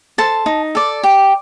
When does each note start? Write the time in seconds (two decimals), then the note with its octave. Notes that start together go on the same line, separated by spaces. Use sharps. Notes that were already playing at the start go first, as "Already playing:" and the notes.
0.18 A4 C5 A5
0.46 D#4
0.75 A4 D5
1.03 G4